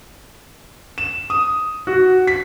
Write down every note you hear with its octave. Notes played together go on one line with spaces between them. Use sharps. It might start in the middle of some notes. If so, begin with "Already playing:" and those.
E7
D#6
F#4
B6